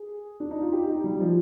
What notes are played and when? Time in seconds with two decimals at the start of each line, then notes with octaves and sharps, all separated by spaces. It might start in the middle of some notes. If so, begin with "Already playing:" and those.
Already playing: G#4
0.40 D4
0.51 D#4
0.62 F4
0.73 G4
0.88 D#4
1.04 G3
1.20 F3